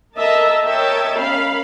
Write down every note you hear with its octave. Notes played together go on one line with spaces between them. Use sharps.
A4 A#4 D#5 E5 A5 A#5
A#4 C#5 D#5 E5 G5 A5
C#4 A#4 F5 B5